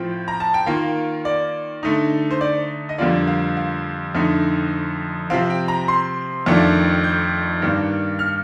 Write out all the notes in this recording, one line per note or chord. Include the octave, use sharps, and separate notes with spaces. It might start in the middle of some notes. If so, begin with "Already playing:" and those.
Already playing: A2 F3 C4 F4 G5
A#5
A5
G5
D#3 A#3 F4 F5
D5
D3 A3 D#4
C5
D5
D#5
F2 D3 G3 A#3 F4 D5
F5
F5
F2 D3 A3 D#4
C3 F3 C4 F5
G5
A#5
C6
F2 D#3 A3 D4 F4
G6
G2 D#3 A#3 D4
F6